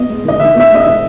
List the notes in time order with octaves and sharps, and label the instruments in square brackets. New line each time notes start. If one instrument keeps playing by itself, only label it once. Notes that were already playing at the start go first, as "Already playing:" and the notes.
Already playing: [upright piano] B3 [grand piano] D#5
[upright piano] G#3
[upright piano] D#3 [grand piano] D#5
[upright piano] D#3 [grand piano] E5
[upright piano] B3 [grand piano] E5
[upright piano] G#3 [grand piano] D#5
[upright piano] D#3 [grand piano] E5